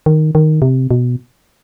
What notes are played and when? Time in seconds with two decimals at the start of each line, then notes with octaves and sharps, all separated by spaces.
0.06 D#3
0.35 D#3
0.62 C3
0.91 B2